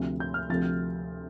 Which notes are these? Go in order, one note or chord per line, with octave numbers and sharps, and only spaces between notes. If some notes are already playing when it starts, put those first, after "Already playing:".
Already playing: D2 C3 F3
G6
F6
D2 C3 F3 A6